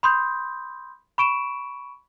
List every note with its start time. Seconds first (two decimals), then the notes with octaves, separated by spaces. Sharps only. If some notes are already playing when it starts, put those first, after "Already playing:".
0.03 B5 C6 D#6 G6
1.18 B5 C#6 D7 E7